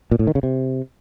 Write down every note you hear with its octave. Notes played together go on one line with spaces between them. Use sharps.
A#2
A2
D#3
C#3
C3